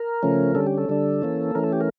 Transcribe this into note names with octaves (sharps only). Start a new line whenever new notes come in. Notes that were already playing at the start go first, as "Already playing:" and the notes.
Already playing: A#4
C#3 F3 A3 C#4
D3 G3 C#4 A4
G4
A4
D3 G3 D4
E3 A#3 C#4
E3 A3 C#4 A#4
A4
G4
A#4